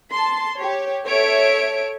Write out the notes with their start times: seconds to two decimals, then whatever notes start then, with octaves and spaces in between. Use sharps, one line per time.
0.12 A5 C6
0.59 G4 C#5
1.06 A4 C#5 E5 D7